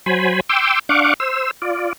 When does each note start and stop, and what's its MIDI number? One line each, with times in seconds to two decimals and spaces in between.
0.06 0.40 54
0.06 0.40 72
0.06 0.40 80
0.06 0.40 83
0.49 0.79 79
0.49 0.79 84
0.49 0.79 86
0.49 0.79 88
0.89 1.14 62
0.89 1.14 77
0.89 1.14 78
0.89 1.14 85
0.89 1.14 86
1.20 1.51 72
1.20 1.51 88
1.62 1.93 65
1.62 1.93 74